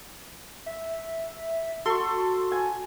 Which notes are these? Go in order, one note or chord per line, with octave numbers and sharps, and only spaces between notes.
E5
F#4 A4 C6 C#6
G#5